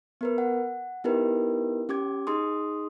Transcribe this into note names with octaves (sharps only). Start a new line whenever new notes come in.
B3 A#4 B4
F#5
B3 D#4 E4 G4 A#4 B4
C#4 G4 D6 G#6
D#4 G#4 C6 D#6